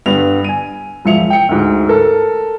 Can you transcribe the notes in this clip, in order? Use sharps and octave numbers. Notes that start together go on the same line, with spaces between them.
G2 D3 B3 F7
G#5 D#7
E1 F3 E5 C#7 F7
G5 C#7
D2 G#2
A4 A#4 A5